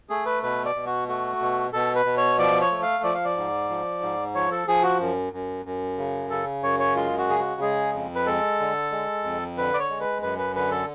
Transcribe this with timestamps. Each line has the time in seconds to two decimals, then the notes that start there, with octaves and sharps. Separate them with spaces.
0.09 A3 G#4
0.26 B4
0.43 B2 B4
0.65 D5
0.75 B2
0.86 F#4
1.08 A3 F#4
1.41 B2
1.73 B2 A4
1.96 B4
2.05 B2
2.17 C#5
2.38 F3 D5
2.61 C#5
2.71 A3
2.82 F5
3.04 F3 D5
3.15 F5
3.25 D5
3.37 G#2
3.70 F3
4.02 G#2
4.35 F3 C#5
4.51 A4
4.68 F3 G#4
4.83 F#4
5.00 F#2
5.33 F#2
5.65 F#2
5.98 C#3
6.30 C#3 A4
6.63 F#2 C#5
6.79 C#5
6.96 G#3 F4
7.18 F#4
7.29 C#3 G#4
7.39 F#4
7.61 G#3 G#4
7.93 F2
8.15 B4
8.26 G#3 A4
8.60 D3
8.92 G#3
9.24 F2
9.57 D3 B4
9.74 D5
9.79 C#5
9.90 G#3
10.00 B4
10.22 F#2 B4
10.38 B4
10.55 D3 B4
10.71 A4